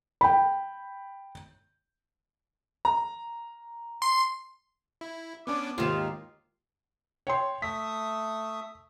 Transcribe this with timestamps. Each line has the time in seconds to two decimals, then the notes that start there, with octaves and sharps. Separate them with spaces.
0.21 G5 B5
2.85 A#5
4.02 C6
5.01 E4
5.47 B3 C#4 D4 D6
5.78 D#2 G#2 D#3 F4 G4 F5
7.27 C#5 G5 C6
7.62 A3 E5 D#6 B6